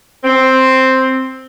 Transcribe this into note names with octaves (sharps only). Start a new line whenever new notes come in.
C4